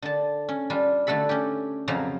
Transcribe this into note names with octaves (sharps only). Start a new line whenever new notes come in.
D3 A5
C#4
G3 D4 F4
D3 A3 F#4 A4 B5
C#4 G4
F2 C#3 F3 F#3 F5 A#5